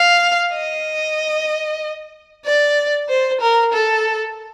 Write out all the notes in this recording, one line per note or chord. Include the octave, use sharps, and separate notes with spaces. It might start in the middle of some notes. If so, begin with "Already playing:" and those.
Already playing: F5
D#5
D5
C5
A#4
A4